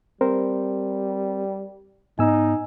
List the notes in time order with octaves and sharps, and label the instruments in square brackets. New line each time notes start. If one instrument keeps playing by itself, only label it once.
[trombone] G3 [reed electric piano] C4 A#4 C5
[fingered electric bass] G#2 B3 [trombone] D#4 [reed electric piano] G#5 E6